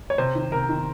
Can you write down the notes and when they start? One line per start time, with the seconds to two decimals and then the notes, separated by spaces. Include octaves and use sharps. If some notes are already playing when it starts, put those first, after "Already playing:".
0.10 C#5
0.18 C3 C5
0.35 D#3
0.52 C3 A#4
0.69 D#3